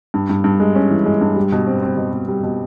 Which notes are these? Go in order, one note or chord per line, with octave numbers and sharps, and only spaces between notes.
G2
G2
G2
G#3
C#4
E3
G#3
G2
G3
B2
C4
C4
B2
B2
G3
B2